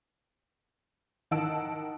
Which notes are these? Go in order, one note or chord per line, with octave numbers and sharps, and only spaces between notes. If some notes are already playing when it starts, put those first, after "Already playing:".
D#3 D#5 F#5 A5 E6 D7